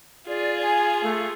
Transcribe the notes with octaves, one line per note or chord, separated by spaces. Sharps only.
F4 G#4 D5
G#5
A3